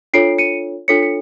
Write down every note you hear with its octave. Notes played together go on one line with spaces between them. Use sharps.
D4 F4 A4 C#5 C7 D7
C#7 D#7
D4 F4 A4 C#5 B6 C#7
C#7